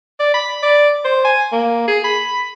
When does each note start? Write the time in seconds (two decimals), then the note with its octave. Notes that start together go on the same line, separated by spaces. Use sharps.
0.19 D5
0.34 B5
0.63 D5
1.04 C5
1.24 G#5
1.52 A#3
1.88 G#4
2.04 B5